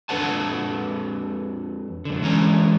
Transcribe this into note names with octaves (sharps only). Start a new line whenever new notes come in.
F2 D4 A4 B4 F#5 A5
F#2 D3
G#2 E3 C#4 A#5